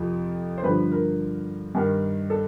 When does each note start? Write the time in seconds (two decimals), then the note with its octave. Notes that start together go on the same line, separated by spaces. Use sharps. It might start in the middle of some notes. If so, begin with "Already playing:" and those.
Already playing: F2 C3 F3
0.58 C5
0.63 G2 D3 F3 B4
0.92 A#4
1.75 G2 D#3
2.30 A4